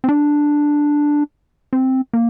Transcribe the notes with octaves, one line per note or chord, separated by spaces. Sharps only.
C4
D4
C4
A#3